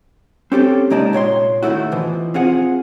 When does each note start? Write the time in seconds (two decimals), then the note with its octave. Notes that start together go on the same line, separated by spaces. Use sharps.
0.52 C4 C#4 G4 A4
0.90 C2 G#3 A#3 D#4 D5 A5
1.13 A#2 C#5 F#5 C6
1.63 A2 D#3 F#3 A3 E4 F#4
1.92 B2 E3 F3
2.34 C4 F4 G#4 F#5